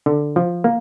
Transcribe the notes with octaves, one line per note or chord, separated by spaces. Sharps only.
D3
F3
A#3